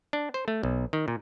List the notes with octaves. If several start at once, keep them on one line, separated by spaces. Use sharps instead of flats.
D4
C5
A3
B1
D#3
A#2